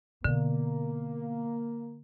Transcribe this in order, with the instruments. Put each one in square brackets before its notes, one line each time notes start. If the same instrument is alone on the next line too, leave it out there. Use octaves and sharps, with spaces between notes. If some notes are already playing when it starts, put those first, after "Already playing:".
[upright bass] B2 [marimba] D3 [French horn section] A#3